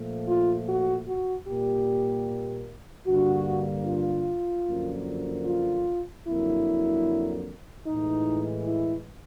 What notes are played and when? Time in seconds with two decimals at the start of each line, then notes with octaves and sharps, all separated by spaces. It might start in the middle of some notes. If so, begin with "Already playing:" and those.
Already playing: A#2 F3 A3
0.27 F4
0.67 F#4
1.06 F#4
1.46 A#2 G3 A#3 G4
3.06 G2 D3 G3 A#3 F#4
3.86 F4
4.67 F#2 D3 F3 A#3
5.46 F4
6.26 F2 D3 F#3 A#3 E4
7.86 A2 E3 G#3 D#4
8.66 E4